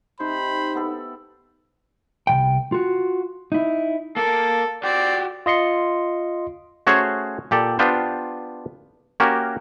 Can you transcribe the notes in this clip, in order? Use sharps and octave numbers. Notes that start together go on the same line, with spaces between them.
C3 D#4 C5 B5
B3 E4 A4
C2 A#2 G5
F4 F#4
D#4 E4
A#3 A4 A#4
C4 F#4 G4 D5
F4 D#5 C6 C#7
A3 C#4 F#4 G#4 C5 C#5
A#2 G4 A4 D5
B3 D4 F4 G4 C5
A#3 C#4 F#4 G4 A#4